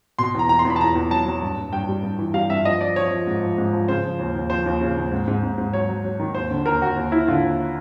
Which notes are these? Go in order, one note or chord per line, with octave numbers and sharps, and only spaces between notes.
B2 C6
E2 A#5
E2 A#5
C6
E2
B5
A5
E2 A#5
E2
F#3 A5
F#3
G2
G2
G2 G5
G3
G2
E3
G3 F5
G2 E5
F3 D#5
F3 D5
F3 C#5
F3
G#2
F3
G#2
F3
C#3 C5
F3
D#2
D#2
F3 C5
D#2
C#3
D#2
G#2
G#2
G#2
G#2
F#3 C#5
F#3
F#3
D#3
D#2 C5
D3
D#2 A#4
D#2 F#4
D#2
D#2 E4
D3 F4
D#2